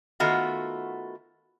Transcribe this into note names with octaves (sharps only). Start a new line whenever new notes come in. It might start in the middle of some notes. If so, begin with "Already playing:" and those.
D#3 A3 B3 F4 F#4